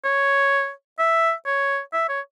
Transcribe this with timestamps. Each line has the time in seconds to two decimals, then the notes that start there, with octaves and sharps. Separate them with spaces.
0.04 C#5
0.99 E5
1.46 C#5
1.93 E5
2.09 C#5